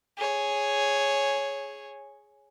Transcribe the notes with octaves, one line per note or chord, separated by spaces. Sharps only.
G#4 C#5